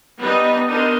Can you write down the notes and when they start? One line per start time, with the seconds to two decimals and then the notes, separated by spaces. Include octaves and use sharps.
0.19 G3 B3 D4 D#4 B4 D#5
0.69 B3 D4 D#4 A#4 C6